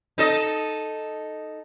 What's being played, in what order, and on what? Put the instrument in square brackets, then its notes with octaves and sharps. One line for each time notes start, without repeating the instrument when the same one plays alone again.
[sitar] D#4 A4 D#5